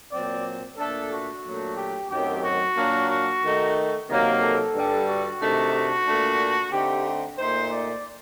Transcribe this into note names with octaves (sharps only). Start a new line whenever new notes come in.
A#2 F#3 C4 D5
A#2 A3 D4 A4
F#4
A#2 F#3 A3 D4
G4
F#2 D#3 F#3 A3 C4 G4
F#4
A#2 F#3 A#3 D4
F#4
D#3 A3 D#4
C3 D#3 F#3 A#3
A4
G2 D3 G3
F#4
C3 D#3 A3 D4
F#4
A#2 A3 D4
D3 A3 C4 D#4 G4
A#2 A3 D#4 C5
D5